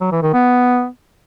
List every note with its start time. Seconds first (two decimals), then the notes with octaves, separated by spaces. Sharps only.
0.01 F#3
0.12 E3
0.23 D#3
0.34 B3